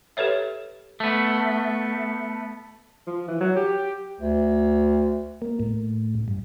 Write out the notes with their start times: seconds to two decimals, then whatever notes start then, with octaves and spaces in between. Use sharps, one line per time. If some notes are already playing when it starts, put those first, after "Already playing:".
0.17 G4 A4 B4 C#5 E5
1.00 A3 B3
3.07 F3
3.28 E3
3.41 F#3
3.56 G4
4.20 D2
5.42 A#3
5.60 A2
6.28 G2